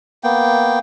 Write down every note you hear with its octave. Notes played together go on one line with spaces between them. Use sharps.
A#3 B3 G5